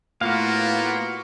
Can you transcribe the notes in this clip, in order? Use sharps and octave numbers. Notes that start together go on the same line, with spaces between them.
A2 A#3 B3 F4 F#4 F5